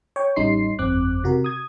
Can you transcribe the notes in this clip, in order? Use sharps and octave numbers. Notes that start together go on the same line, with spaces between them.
C#5 G5 C#6
A1 G3 C#4 D#4 C6 C7
G1 F2 C4 D6 F#6
C3 F#4 A#4
D#6 G#6